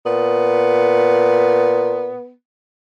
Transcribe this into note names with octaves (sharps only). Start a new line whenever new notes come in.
A#2 B3